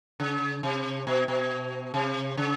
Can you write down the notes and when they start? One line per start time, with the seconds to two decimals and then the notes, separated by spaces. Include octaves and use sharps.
0.20 C#3
0.63 C3
1.07 B2
1.28 B2
1.94 C3
2.37 C#3